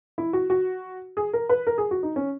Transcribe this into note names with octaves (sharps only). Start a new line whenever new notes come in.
E4
F#4
F#4
G#4
A#4
B4
A#4
G#4
F#4
D#4
C#4